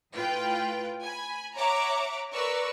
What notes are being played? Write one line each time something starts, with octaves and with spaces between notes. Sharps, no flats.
A2 F4 B4 G5
G#5 B5
C#5 E5 F#5 A#5 D6
A#4 B4 D5 C#6 E6